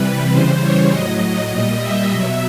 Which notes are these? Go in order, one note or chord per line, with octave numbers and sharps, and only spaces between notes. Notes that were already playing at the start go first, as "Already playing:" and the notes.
Already playing: C3 E3 G3 B4
C#3 E3 G3 C5
C#5
A2 F#3 D#5
A#2 G3
E5
B2 F#3